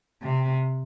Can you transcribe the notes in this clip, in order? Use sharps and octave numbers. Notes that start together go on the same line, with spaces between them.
C3